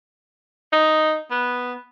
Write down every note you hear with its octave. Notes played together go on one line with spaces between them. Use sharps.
D#4
B3